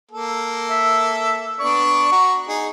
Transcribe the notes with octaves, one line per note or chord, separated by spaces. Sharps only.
A#3 A4
E5
B3 D4 D5 C#6
F#4 A#5
D#4 G#4